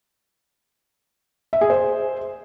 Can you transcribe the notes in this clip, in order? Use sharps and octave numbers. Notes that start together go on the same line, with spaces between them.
E5
G#4
C5